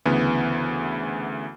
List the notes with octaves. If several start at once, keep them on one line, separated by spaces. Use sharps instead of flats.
D2 C#3 E3 B3